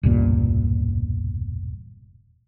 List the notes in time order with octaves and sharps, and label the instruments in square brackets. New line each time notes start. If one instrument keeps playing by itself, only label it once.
[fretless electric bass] E1 C#2 G2 A#2